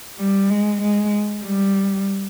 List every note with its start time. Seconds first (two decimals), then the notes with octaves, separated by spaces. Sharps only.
0.19 G3
0.50 G#3
0.81 G#3
1.44 G3